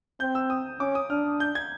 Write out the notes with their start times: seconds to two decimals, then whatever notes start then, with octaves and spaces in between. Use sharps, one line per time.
0.20 C4 G6
0.35 E6
0.50 D#6
0.80 C#4 D6
0.95 D#6
1.10 D4 F6
1.40 G6
1.55 G#6